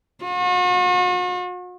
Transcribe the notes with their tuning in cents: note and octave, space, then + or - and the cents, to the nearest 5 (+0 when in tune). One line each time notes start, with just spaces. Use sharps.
F#4 -45